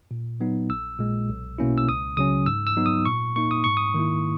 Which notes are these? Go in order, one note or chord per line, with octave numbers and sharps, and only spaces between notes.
A#2
F#3 B3 D#4
A#1 E6
A#2 G#3
B1
B2 A#3 C#4 E4
E6
C#2 D#6
C#3 F#3 C#4 D#6
G#2 E6
E6
F#3 B3 D#4
D#6
A#2 C#6
A#3 D#4 C#6
D#6
G#2 C#6
D#6
D#3 A#3 E4